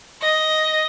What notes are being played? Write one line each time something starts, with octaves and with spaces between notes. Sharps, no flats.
D#5